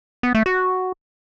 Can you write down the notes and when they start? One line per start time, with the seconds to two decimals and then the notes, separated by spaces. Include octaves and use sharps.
0.23 B3
0.35 A3
0.46 F#4